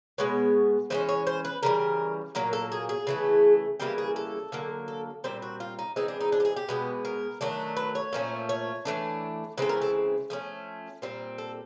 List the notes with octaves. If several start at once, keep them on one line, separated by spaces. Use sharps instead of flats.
B2 G#3 B3 C#5
E3 G#3 C#4 C5
C#5
C5
B4
C#3 E3 G3 A#4
A#2 F#3 A#3 A#4
A4
G#4
G#4
C#3 E3 A3
C#3 E3 G3 A#3 G4
G#4
A4
D3 F#3 A#3
A4
A#2 G3 C4 C5
F#4
F4
D#4
E3 G#3 C4 D#4
D4
D#4
D4
G4
G#4
G4
B2 G#3 B3
A#4
D#3 F#3 A3 D4
B4
C#5
A#2 F3 A3 C#4
C#5
E3 A3 D4
C#3 E3 G#3 C4 A4
A#4
A4
F3 A3 C#4
A#2 G3 C4
A4